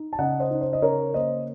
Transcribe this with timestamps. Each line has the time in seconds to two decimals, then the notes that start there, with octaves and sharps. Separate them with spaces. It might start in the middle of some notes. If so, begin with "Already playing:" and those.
Already playing: D#4
0.13 A5
0.19 C#3 D#5 F#5
0.40 C5 D#5
0.51 D#4
0.61 C5
0.73 D#5
0.82 C#3 A#4 C#5
1.14 A#3 C5 D#5